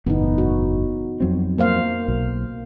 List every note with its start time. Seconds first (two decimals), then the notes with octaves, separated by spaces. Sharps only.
0.06 F#1 E2 A2 B3 D#4
0.38 F#4
1.20 F2 F#3 C4
1.58 A#3 C5 F5
2.08 B1